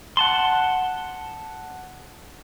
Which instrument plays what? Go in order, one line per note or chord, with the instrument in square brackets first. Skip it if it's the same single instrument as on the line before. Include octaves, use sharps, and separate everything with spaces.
[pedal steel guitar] F#5 A5 C6